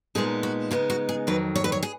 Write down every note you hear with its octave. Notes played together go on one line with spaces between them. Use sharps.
A#2 F3 G#3 B3 D#4 G#4
F#4
C#3 G#3 B3 D#4 F4
F#4
G#4
F2 D#3 F#3 B4
C#5
B4
C#5
G#4